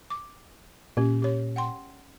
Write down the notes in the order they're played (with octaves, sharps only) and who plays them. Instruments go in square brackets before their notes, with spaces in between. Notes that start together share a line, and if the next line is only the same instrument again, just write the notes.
[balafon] D6
[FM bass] A#2 [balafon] C#4 G4
[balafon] G4 C#5
F#5 G5 C6